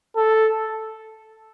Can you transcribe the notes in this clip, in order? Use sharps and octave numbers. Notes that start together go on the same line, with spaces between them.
A4